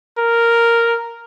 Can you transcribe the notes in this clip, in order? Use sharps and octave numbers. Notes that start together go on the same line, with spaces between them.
A#4